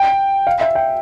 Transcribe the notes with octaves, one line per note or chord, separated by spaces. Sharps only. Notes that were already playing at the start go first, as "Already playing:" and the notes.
Already playing: G5
F5
E5
G5